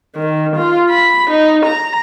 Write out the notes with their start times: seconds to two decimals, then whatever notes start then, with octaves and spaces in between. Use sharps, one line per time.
0.16 D#3
0.56 F4
0.90 B5
1.31 D#4
1.66 A#5